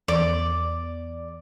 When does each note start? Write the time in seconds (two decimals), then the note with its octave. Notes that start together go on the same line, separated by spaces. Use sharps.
0.08 E2 D5